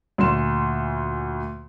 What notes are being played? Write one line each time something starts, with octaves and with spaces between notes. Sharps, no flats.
D2 A#2 C6 E7